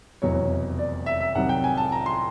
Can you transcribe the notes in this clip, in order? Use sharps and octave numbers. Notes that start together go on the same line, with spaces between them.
F1 E2 B2 F#3 C#5
D5
E5
E5
C2 C3 D#3 F#3 F#5
G5
G#5
A5
A#5
C6